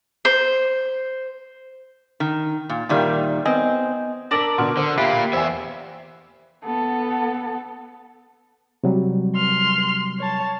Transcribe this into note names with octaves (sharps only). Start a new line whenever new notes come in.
C5
D#3
A#2
A#2 D#3 G3 A#4 D5 E5
B3 C4 D#5 G#5
D4 A#4 D5 A5 E6 B6
B2 D3 F#5 C6 F6
D3 C5
A#3 F4 G4 E5 B5 F#6 C7
E2 C5 E5 G#5
B3 A4
C3 F#3 G3
C6 F6
C#5 A5